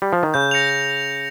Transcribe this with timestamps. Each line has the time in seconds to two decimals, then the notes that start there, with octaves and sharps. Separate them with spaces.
0.02 G3
0.13 F3
0.23 D#3
0.34 C#3 G6
0.51 A#6 C#7 F7
0.69 G6